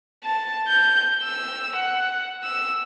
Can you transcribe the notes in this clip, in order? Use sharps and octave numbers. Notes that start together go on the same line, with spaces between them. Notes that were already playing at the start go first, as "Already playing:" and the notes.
A5
G6
E6
F#5
E6